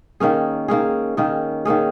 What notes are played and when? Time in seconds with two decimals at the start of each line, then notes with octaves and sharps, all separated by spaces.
0.20 D#3 A#3 C#4 G#4
0.68 D#3 A#3 C#4 G#4
1.17 D#3 A#3 C#4 G#4
1.65 D#3 A#3 C#4 G#4